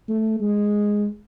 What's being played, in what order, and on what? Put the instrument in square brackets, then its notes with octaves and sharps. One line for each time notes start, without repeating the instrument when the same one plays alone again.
[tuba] A3
G#3